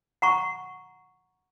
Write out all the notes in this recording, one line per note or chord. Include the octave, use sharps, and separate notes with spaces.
F#5 A#5 C#6